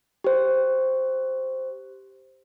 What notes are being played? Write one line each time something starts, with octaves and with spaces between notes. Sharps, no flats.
G4 C5